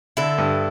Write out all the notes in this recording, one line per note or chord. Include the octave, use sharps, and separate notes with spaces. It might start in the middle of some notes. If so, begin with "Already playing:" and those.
D3 E4 A4
G2